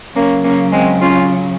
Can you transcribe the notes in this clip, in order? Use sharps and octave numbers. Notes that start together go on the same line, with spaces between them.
C#3 F#3 A#3 C#4
A#3 C#4
G#3 C4
C#4 F4